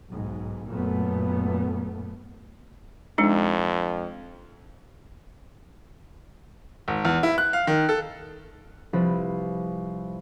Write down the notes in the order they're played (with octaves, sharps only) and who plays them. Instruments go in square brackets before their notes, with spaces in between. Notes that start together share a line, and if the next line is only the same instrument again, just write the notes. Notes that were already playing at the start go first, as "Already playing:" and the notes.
[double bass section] B1 G#2
F#2 A#2 A3 B3
[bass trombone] F2 [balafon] G#3 D4 D#4
[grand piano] G#1
E2
E4
F#6
F5
D#3
A4
[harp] C2 F3 B4 A6